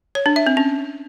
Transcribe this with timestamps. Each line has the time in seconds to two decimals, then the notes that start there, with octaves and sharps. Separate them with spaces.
0.15 C#5
0.26 D4
0.36 E5
0.47 C4
0.57 C#4